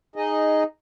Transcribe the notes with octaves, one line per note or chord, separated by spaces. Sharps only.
D#4 G#4 D#5